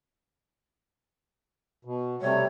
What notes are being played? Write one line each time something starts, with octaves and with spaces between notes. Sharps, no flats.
B2
C3 G3 A3 C#5